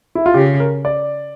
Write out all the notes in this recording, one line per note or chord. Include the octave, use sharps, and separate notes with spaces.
E4
F4
C#3 G4
A#4
D5